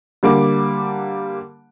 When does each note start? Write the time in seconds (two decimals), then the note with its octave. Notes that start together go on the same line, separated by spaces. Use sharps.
0.23 D3 G3 A#3 D6